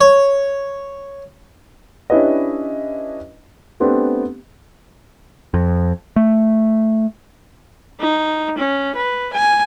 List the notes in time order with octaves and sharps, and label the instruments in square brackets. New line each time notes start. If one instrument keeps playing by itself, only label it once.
[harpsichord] C#5
[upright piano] C#4 D4 E4 G4 B4 D#5
A3 B3 C4 D4 G4
[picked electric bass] F2
A3
[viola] D#4
C#4
B4
G#5